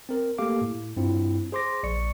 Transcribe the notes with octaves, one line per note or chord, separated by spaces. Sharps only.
C4 A#4
A3 A#3 G4 A4 F5 D6
A2
G2 C4 E4 F4
G#4 C5 C6 D6 A#6
A#1 D5 C#6 C#7